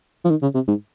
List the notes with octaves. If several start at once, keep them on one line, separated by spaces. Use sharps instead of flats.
F3
D#3
C#3
C3
G#2